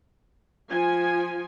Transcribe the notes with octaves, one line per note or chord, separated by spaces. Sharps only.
F3 G#5